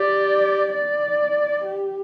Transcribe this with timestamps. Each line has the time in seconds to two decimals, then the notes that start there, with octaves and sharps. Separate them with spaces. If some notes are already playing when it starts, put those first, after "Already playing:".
Already playing: G4 D5
0.74 D5
1.65 G4